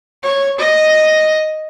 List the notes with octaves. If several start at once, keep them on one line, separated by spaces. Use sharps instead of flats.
C#5
D#5